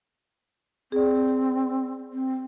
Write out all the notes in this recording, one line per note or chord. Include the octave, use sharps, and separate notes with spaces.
C4 G#4 D5
C4